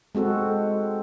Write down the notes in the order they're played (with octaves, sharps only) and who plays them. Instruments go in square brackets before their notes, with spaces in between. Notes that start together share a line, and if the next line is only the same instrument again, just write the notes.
[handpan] G#3 C4 F#4 A4